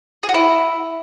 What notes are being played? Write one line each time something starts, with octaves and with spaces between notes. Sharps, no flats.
G#4
F#4
E4